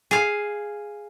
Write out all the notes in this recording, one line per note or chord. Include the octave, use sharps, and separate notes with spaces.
G#4 F5